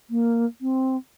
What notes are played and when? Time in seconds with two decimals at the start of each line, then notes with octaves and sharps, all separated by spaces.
0.10 A#3
0.61 C4